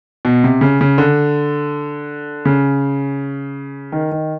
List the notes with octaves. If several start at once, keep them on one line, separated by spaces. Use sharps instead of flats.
B2
C3
C#3
C#3
D3
C#3
D#3
D#3